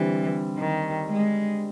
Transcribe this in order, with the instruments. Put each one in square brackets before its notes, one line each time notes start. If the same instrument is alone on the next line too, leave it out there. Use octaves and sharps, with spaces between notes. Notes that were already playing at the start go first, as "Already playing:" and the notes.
Already playing: [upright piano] D3 G3 C4 [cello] E3
[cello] D#3
G#3